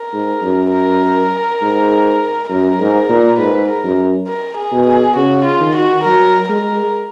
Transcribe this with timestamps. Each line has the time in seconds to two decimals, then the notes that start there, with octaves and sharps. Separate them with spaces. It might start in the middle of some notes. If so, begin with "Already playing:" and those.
Already playing: A#4
0.13 G#2
0.43 F#2
0.72 A#4
1.62 G#2
2.50 F#2 A#4
2.80 G#2
3.09 A#2
3.39 G#2 B4
3.68 A#4
3.83 F#2
4.28 A#4
4.58 G#4
4.72 B2
4.87 G#4
5.16 C#3 F#4
5.45 F4
5.60 D#3
5.76 F#4
6.04 F#3 A#4
6.49 G#3 A#4